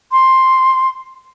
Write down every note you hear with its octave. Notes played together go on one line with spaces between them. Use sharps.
C6